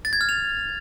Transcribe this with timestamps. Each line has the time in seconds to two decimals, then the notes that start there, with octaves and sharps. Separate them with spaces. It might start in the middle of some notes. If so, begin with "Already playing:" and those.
0.05 A6
0.13 G#6
0.21 F6
0.29 F7